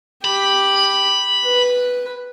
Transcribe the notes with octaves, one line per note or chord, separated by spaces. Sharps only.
G4 B5
B4